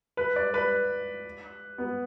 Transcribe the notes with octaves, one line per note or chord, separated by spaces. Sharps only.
B4
D5
B4
B3